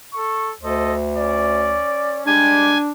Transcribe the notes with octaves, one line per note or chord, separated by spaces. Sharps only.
A4 C#6
D2 A4 C5 D#5
C#4 D5
G3 G#3 D4 G4 G#5